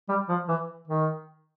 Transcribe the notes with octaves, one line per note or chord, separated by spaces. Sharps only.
G3
F3
E3
D#3